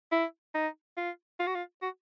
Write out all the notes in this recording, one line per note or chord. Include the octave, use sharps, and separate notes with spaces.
E4
D#4
F4
F4
F#4
F4
F#4